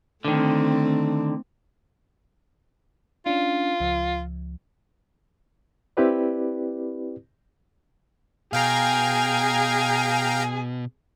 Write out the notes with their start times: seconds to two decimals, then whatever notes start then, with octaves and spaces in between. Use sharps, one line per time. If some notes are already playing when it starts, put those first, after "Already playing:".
0.25 D3 D#3 A3 C4
3.26 C#4 D4 F4
3.80 C#2 F3
5.97 C4 E4 G4 B4 D5
8.53 B2 G#4 F5 G5 G#5 A#5